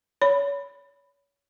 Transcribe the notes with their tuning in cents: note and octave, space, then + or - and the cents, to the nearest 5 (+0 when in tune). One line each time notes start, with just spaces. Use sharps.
C#5 +30 B5 +0